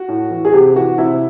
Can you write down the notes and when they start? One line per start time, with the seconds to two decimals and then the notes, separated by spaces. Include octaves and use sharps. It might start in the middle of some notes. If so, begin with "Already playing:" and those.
Already playing: F#4
0.08 A2
0.31 E3
0.45 G#4
0.53 C3 G4
0.75 E3 F#4
0.98 C3 E4